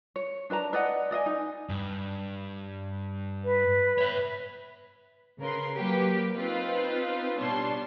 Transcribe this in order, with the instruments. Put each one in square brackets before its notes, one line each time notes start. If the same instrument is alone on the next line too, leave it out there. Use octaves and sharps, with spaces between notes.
[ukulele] C#5
D4 B4 A5 A#5
B4 D5 D#5 F#5
D5 D#5 F5 G#5
D#4
[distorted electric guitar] G2
[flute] B4
[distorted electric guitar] C#5 E5
[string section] C#3 A#4 B4 C6
F#3 A#3 G4 B4
C4 D#4 F4 B4
B2 G3 D4 C#5 A5 C6